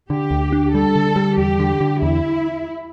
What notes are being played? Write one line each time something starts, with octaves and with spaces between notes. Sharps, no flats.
D3 G4
D2
D4
G3 A4
D3
G3
E2 G4
D3
D3
E2 E4